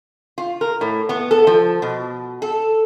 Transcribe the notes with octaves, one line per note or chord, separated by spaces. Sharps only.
F4
A#4
A2
B3
A4
F3
B2
A4